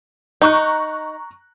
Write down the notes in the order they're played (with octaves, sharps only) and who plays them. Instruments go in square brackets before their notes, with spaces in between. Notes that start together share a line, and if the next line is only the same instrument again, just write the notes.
[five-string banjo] D#4 [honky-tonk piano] A#5 C#6 F#6